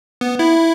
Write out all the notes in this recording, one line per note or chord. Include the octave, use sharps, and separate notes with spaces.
B3
E4